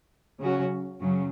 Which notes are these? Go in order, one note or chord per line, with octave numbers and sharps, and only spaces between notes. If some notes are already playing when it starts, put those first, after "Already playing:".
C#3 F#3 C#4 F#4
F#2 C#3 F#3